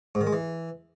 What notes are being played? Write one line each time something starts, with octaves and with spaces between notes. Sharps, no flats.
G#2
D#3
G#3
E3